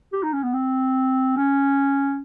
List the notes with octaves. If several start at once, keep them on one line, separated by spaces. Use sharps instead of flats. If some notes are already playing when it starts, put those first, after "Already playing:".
G4
D#4
C#4
B3
C4
C#4